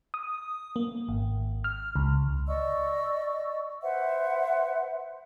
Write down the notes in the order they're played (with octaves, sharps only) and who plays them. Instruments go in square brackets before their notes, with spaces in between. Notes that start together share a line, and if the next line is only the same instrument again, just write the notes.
[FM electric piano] D#6
A#3
G#1
F6
C#2
[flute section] D5 D#5 C#6 E6
B4 C5 E5 F#5